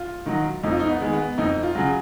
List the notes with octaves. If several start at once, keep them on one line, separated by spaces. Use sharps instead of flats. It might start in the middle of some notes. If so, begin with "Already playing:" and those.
Already playing: F4
D#3 F#3
F2 D#4
F4
D#4
B3
D#3 G#3
B3
F2 D#4
F4
C#3 F#3